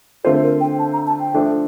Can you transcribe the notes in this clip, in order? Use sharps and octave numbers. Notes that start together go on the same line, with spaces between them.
D3 A3 C4 F4 A4 C5
A#4
G5
A5
A#5
A5
G5
F3 A3 D4 A4